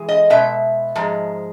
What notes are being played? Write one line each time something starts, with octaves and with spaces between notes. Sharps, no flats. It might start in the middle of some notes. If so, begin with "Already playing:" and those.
Already playing: E3 G#3
D#5
B2 G#3 E5
G#2 F3 G#3